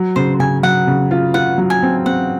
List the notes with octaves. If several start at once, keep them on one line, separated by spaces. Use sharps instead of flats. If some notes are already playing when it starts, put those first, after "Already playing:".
Already playing: F#3
C#3 C5
C#3 G#5
F#3 F#5
C#3
F4
F4 F#5
F#3
G#5
C4
C4 F#5